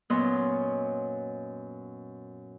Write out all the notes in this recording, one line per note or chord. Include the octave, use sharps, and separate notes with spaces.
F#2 A#2 B3 C#5 D#5 C6